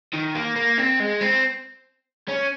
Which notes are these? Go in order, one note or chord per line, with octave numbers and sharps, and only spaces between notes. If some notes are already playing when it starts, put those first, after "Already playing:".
D#3
A#3
A#3
C4
G#3
C4
C#4